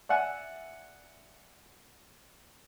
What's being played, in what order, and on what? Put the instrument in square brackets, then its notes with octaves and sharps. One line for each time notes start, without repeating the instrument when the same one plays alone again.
[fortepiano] D5 E5 F#5 G#5